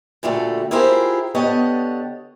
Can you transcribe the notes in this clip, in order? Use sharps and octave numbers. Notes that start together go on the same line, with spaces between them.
A#2 D3 G3 A3 F#4 A4
E4 F4 G4 G#4 A#4 C5
D3 B3 G4 C#5 D#5 A5